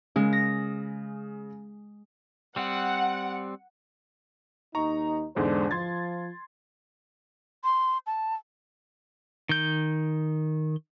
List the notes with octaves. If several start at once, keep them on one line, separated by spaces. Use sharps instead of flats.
C#3 G#3
A#6
G3 C4 F#5
D#2 D#4 A#5 C#6
E2 G#2 D3 G#3 D4 C5
F3 C6 G#6 A6
C6
A5
D#3 G6